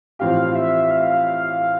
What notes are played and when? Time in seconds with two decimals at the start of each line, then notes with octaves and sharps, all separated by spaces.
0.19 A1 A2 F3 C4 G4 F5
0.55 E5
0.91 F5